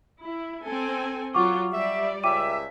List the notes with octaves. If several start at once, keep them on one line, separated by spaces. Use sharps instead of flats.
E4
C4 A4 G#5
F#3 F4 F#5 C#6 D6
G3 D5 E5
C#2 E5 G5 D6 D#7